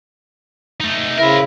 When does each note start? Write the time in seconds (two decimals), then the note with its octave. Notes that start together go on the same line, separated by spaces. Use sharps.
0.80 A3 D#4
1.19 C#3 E4 A#4 C5 E5